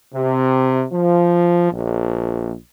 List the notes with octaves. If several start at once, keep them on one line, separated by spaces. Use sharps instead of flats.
C3
F3
A#1